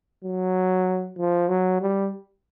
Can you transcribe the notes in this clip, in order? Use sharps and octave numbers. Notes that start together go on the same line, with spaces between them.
F#3
F3
F#3
G3